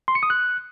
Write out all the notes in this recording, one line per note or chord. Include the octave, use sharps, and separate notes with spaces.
C6
C#7
D#6
F#6